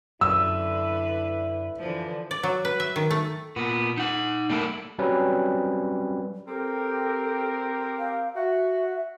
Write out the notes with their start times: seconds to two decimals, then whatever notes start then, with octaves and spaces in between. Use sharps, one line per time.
0.21 F#2 D3 E4 B4 E6
1.79 D3 E3 F3
2.31 D5
2.43 F#3
2.65 B4
2.80 E5
2.96 D#3
3.11 A3
3.56 A#2 B3
3.97 D#4 F#5
4.50 G3 A3 A#3 E4 A4
4.99 F#3 G3 C4 C#4 B4
6.48 C4 G4 A4 A#4
7.99 F5
8.35 F#4 E5 F#5